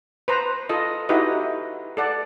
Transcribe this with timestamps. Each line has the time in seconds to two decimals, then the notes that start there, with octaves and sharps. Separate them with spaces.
0.28 B4 C5 A#5
0.69 F4 A4 D#5
1.09 D#4 E4 F#4 G4 B4 D#5
1.97 A4 D5 F#5